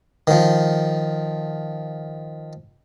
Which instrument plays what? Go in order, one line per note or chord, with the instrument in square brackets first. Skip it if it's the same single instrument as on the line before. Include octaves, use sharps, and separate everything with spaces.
[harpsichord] D#3 F3